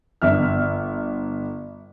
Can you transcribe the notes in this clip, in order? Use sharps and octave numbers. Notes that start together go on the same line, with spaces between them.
G1 E5 F6